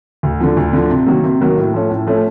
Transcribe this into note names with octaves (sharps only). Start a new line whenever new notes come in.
D2
D3 F3
D2
D3 F3
C3
D#3 F#3 A#3
C3
D#3 F#3 A#3
A2
F3 A3 C#4
A2
F3 A3 C#4